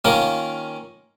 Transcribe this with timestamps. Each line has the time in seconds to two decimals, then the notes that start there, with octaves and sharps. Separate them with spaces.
0.05 D#3 A#3 C#4 F4 A#4